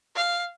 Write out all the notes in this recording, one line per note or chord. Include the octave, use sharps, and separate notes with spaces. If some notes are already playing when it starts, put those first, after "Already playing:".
F5